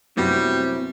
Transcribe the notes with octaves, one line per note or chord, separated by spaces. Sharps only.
F#2 C3 G3 A3 B3 C4 E4 F#4